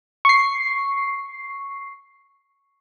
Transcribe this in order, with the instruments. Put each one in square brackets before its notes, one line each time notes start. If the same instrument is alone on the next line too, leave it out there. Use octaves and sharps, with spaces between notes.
[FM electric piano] C#6 C7